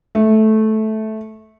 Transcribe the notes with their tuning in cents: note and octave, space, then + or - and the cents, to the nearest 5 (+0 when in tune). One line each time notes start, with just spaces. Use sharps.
A3 -10